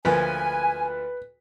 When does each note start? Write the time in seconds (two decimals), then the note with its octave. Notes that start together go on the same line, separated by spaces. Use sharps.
0.05 D2 F3 A#3 B4 G#5